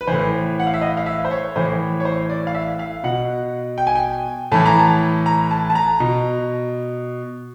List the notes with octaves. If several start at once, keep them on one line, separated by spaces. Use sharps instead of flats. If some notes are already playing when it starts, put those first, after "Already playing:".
B4
A2 E3 C5
F#5
F5
E5
D#5
F5
E5
C5
C#5
A2 E3 C5
C#5
C5
D5
F5
E5
F5
B2 F#5
G5
G#5
G5
A2 E3 A5
A#5
A5
A#5
A5
A5
A#5
B2